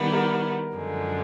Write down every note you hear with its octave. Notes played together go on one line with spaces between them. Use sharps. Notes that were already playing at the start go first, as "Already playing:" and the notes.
Already playing: D#3 G3 B3 E4 A#4
A#4
F#2 D3 F3 G#3